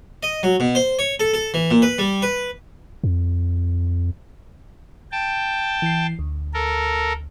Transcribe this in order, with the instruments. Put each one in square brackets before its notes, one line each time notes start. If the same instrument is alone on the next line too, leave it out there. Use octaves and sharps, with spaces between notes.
[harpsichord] D#5
F#3
B2
C5
C#5
A4
A4
E3
A#2
B4
G3
B4
[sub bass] F2
[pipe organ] G5 A5
[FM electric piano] E3 C7
D2
[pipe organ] A4 A#4